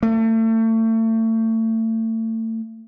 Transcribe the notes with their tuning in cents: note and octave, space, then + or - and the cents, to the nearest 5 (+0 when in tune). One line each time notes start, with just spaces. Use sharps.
A3 +35